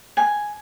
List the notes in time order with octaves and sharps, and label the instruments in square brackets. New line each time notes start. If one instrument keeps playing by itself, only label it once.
[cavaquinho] G#5